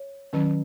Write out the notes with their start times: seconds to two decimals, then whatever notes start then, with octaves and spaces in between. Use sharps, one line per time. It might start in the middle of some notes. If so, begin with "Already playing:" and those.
Already playing: C#5
0.33 D#3 F#3 C#4